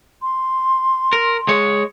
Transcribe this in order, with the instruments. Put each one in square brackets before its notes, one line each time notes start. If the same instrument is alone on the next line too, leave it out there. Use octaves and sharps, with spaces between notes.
[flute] C6
[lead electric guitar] A#4
G#3 C#5